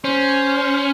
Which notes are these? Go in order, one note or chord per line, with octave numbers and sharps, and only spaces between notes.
C#4 C5